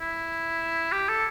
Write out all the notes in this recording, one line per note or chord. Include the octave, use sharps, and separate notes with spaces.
E4
G4
A4